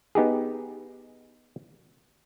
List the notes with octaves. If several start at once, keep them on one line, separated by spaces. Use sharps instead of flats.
B3 D#4 G4 G#4